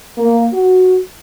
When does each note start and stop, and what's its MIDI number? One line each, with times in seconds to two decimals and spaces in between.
0.18 0.46 58
0.53 0.98 66